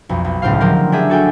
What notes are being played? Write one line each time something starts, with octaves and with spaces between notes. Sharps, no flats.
B1 F2
B1
D#1 C#2 A2 G4 C5 F5
D3 F3 F#3 G4 A#4
D4 G4 G#4 E5
F#4 A4 G5 G#5